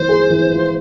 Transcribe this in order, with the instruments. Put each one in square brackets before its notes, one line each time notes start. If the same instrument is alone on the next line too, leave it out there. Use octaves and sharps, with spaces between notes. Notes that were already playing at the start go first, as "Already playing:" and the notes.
Already playing: [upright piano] E3 A#3 [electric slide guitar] C5
[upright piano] G#4
E3
F4